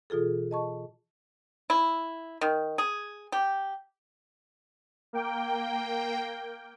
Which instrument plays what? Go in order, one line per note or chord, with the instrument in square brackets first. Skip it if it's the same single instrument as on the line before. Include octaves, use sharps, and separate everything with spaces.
[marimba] B2 E3 F4 G#4 A4
D#5 A5 C#6
[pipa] E4
D#3
G#4
G4
[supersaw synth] A#3 G5